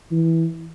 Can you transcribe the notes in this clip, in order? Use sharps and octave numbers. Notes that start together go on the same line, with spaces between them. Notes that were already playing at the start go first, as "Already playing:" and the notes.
E3